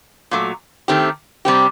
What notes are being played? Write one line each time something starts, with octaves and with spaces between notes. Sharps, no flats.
A#2 F#3 A3
D#3 A3 C4 G4
C3 G3 C4 G4